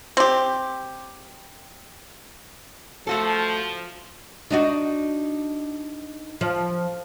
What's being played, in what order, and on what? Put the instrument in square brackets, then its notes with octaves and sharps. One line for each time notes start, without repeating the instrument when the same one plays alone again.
[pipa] C4 G4
[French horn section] F3 [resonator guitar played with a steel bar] A3 F#4 A4
[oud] D4 D#4 F#4
F3